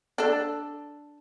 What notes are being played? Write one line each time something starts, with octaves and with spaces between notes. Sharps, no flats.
D4 A4